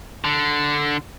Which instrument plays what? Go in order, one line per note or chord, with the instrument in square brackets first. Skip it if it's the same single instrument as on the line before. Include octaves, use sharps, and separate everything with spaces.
[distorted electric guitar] D3